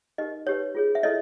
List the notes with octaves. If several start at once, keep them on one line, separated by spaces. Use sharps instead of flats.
D#4 G4 A#4 D#5
D#4 G4 B4 C#5
F4 G#4 C#5
E5
E4 A4 C#5 D#5